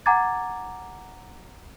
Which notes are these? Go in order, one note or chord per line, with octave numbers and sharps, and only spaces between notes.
F#5 G#5 A#5 D6 G#6 A6